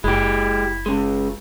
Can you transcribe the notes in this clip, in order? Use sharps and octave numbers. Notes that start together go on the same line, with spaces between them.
F#1 G#3 E4 G4
C#3 G#3